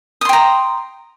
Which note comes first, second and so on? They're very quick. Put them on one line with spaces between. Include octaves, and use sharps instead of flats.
D#6 C6 G5 A#5